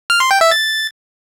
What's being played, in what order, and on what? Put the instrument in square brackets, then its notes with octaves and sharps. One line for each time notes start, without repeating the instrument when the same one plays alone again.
[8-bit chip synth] F6
C6
G5
E5
A6